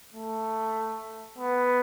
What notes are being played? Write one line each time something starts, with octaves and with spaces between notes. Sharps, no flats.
A3
B3